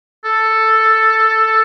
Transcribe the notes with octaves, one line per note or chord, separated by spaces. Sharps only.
A4